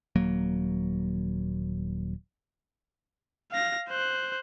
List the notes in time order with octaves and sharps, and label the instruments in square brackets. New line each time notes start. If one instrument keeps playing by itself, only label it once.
[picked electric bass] D#1 F#3 A#3
[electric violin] F5 A#6
C5 F#6